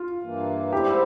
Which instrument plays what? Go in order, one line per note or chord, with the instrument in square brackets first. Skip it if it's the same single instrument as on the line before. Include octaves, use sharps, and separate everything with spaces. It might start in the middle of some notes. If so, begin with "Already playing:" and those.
Already playing: [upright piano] F4
[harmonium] G2 E3 A#3
[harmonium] G#2 G3 C4 E4 [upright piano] G4